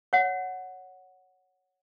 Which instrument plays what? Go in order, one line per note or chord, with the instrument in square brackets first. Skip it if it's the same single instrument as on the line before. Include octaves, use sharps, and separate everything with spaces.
[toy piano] C#5 F#5